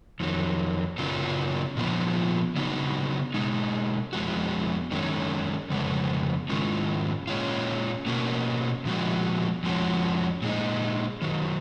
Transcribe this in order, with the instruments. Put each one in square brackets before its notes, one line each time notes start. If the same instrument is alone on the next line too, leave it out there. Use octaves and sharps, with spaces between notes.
[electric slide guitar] F2 D#3 F#3
F#2 C#3 F#3 B3 F4
A#2 F3 B3 F4
C#3 F#3 B3 D#4 F#4
B2 G#3 D#4
F2 C#3 G#3 B3 F#4
F#2 D#3 G#3 C#4
F2 C#3 G#3 B3
G#2 D#3 G#3 C#4 F4
A#2 G#3 C#4 F4
B2 A#3 C#4 F#4
A#2 F3 G#3 B3 F#4
F2 F3 G#3 C#4 F#4
A#2 G#3 D#4
F#2 D#3 F#3